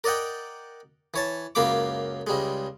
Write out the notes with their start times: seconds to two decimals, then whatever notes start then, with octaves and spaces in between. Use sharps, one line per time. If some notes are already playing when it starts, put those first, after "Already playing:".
0.04 A#4 D5 D#5 F#5 G5
1.14 E3 C#5 A5
1.55 C#2 F#2 A#3 F5 B5 D6
2.27 C#2 G3 G#3